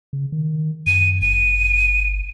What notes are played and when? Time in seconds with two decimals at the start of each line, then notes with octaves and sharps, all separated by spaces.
0.13 C#3
0.32 D#3
0.87 F#2 D#7
1.22 G1 D#7